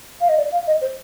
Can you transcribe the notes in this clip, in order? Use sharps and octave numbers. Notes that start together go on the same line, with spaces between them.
F5
D#5
D5
F5
D#5
C5